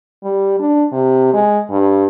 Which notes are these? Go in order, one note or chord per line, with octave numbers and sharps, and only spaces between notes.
G3
D4
C3
G#3
G2